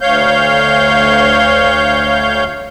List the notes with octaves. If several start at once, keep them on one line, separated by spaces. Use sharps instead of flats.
D2 C#5 F5 G6